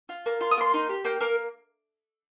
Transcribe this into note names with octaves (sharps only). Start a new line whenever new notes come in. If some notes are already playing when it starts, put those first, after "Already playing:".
F4
A#3
F4 C6
D#6
A#3 C6
D#4
G4
A#3 G5
A#3 A#4